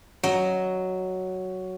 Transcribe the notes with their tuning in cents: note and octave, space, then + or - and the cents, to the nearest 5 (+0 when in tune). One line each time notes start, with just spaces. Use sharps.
F#3 +5 D#5 +0